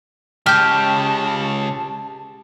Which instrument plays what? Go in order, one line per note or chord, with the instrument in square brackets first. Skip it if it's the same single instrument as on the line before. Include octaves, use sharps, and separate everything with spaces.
[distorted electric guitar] C#3 G#3 [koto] G4 [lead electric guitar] A5 [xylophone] F6 G6